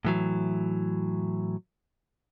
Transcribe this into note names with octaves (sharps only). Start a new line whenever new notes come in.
A2 E3 F#3